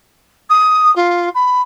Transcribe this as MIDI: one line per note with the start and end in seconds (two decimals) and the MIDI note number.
0.50 0.94 87
0.96 1.29 65
1.34 1.61 83